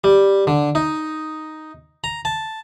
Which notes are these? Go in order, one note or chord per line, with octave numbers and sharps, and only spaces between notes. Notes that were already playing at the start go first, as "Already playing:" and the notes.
G3
D3
D#4
A#5
A5